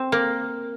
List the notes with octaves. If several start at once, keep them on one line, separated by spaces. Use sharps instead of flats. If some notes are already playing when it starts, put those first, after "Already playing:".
Already playing: C4
A#3